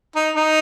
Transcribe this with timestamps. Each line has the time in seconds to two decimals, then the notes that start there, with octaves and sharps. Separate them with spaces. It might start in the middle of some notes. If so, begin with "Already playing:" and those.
0.16 D#4
0.37 D#4